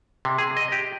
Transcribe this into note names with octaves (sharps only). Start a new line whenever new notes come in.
C3
G#4
D#5
G4